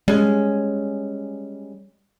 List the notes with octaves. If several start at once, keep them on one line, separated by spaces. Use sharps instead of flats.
G3 G#3 C#4